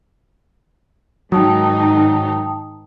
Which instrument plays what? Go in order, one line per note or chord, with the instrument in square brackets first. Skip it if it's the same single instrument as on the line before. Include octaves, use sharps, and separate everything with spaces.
[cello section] G#2 D#3 D#4 [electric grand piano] F#3 [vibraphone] G5 A5 D#6